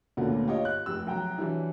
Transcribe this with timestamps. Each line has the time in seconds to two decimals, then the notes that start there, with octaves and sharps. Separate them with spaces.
0.17 D2 A#2 D3 F#3 A#3 B3
0.47 F4 G4 C#5 D#5
0.65 F#6
0.86 F1 G4 E6
1.07 B1 G5 A#5
1.38 E3 F#3 G3 D4 E4